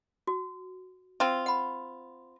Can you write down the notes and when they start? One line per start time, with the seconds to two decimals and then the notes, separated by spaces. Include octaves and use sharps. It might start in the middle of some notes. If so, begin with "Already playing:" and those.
0.27 F#4
1.20 C4 F4
1.46 F#5 B5